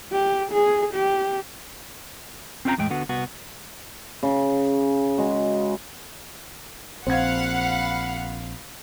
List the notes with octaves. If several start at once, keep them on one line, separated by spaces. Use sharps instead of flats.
G4
G#4
G4
C4 C#4 F4 A#4 G5 A#5
E2 A2 G#3 G5
D3 B3 F#4
C2 B3 F#4
C#3
G#3 F#4
A#1 C4 F5 F#5 B5 G#6